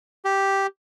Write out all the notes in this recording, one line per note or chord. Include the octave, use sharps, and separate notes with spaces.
G4